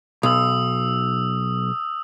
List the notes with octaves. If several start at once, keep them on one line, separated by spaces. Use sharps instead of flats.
B1 D#6 E6